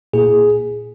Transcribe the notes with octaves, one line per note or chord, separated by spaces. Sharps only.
A#2 A#3 E4 G#4